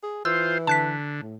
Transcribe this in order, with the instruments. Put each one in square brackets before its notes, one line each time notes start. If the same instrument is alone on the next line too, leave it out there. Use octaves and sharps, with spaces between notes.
[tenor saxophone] G#4
[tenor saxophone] E3 [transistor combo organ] F4 C5 [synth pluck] E6
[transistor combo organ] D3 [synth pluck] A5 F#6 B6
[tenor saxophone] A2